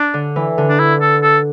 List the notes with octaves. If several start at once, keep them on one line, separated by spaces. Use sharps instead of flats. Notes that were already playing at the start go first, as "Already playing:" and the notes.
Already playing: D4
D3
E3
D3
D4
E4
A4
A4